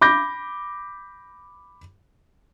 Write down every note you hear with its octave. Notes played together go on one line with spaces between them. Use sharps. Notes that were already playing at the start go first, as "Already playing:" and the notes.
B5 D6 G6 A#6